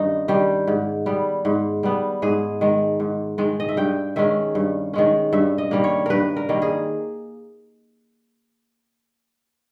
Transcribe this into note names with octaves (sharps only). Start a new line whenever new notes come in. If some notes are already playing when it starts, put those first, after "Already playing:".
Already playing: G2 D#3 C#4 D#4
D#3 G3 G4
G#2
G3 B3
G#2
G3 B3
G#2 G#4
D#3 G#3
G#2
D#3 G#3
D#5
E5
G2 G5
D#3 G#3 C#4 E5
G2
D#3 G#3 C#4
G2 E5
D#5
D#3 G3 A#3
C#5
G2 A#4 B4
A#4
D#3 G3 A#3
G#4